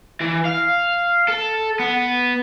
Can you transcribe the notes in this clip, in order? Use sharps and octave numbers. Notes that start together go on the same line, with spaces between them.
E3
F5
A4
B3